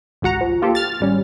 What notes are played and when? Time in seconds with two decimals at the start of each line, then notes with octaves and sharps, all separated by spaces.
0.22 G#1 C#2 F#4 F#5 A#5
0.41 F3
0.62 A#3 F4 G4 A4
0.75 F6 A6
1.00 G#1 G3 C#4